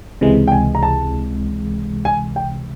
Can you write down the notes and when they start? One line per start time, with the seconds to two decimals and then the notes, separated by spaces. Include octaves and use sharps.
0.21 C#2 C3 E3 G#3
0.48 G5
0.52 G#5
0.75 A#5
0.83 A5
2.05 G#5
2.36 G5